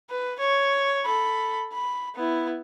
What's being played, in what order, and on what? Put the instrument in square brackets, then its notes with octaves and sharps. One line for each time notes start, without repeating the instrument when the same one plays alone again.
[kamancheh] B4
C#5
A4 B5
B5
B3 E4